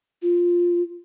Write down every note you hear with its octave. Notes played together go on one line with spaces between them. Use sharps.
F4